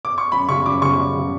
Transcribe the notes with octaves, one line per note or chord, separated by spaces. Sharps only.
D6
C#6
F#2 B5
C#3 G3 C#6
F#2 D6
C#3 G3 C#6
F#2
C#3 G3